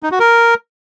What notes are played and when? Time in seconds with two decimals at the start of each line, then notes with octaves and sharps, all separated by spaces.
0.03 D#4
0.11 F#4
0.20 A#4